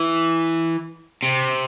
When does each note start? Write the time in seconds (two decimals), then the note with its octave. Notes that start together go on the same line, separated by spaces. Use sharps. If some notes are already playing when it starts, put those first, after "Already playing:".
Already playing: E3
1.23 C3